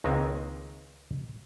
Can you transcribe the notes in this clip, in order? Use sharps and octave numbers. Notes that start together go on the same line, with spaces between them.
C#2 D#3 G#3 A#3 C4 G#5